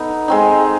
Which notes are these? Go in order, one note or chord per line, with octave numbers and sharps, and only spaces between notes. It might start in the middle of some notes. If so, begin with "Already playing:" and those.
Already playing: B3 D#4 A4
G#3 C4 D#4